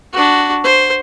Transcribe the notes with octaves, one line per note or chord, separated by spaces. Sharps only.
D4 F#4
C5